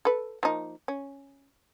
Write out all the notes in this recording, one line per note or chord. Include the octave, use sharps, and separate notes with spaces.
A4 B4
F3 A#3 D#4
C#4